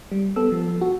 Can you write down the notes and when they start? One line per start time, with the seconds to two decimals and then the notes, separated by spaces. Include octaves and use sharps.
0.12 G3
0.36 B3 A4 E6
0.52 F3
0.81 F#4